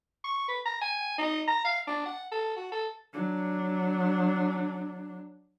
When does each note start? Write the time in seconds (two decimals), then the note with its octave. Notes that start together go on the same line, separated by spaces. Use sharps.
0.24 C#6
0.48 B4
0.65 A#5
0.81 G#5
1.18 D#4
1.47 A#5
1.65 F5
1.87 D4
2.06 F#5
2.32 A4
2.57 F#4
2.72 A4
3.14 F#3 D4